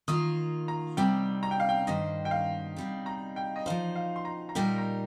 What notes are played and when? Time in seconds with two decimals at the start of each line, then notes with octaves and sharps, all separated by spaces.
0.08 D#3 A#3 F4 D#6
0.68 A#5
0.97 C3 G3 C4 D#4 G5
1.43 A#5
1.51 G5
1.60 F5
1.69 G5
1.87 G2 D#3 A#3 G4 C5 D#5
2.25 G5
2.31 F5
2.76 C3 G3 D#4
3.06 A#5
3.36 G5
3.56 D#5
3.66 F3 D#4 C5 F5
3.95 F5
4.16 C6
4.25 A#5
4.49 A#5
4.55 A#2 G3 D#4 G4 A#4 G5
4.78 A#5